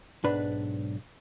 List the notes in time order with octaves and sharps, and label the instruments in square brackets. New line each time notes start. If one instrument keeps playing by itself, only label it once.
[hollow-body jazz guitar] B1 G#2 D4 B4 B5